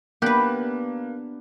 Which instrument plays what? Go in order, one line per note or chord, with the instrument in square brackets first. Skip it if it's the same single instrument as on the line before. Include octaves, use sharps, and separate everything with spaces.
[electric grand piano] A#3 F#6 [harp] B3 D4 [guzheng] G4 B4